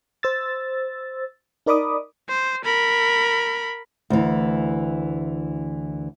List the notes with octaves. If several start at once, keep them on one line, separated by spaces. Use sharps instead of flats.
C5 E6 A6
D#4 A#4 D5 B5 D6 D#6
C5
A#4 B5
D2 E3